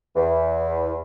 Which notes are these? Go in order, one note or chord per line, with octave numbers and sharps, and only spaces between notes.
E2 E3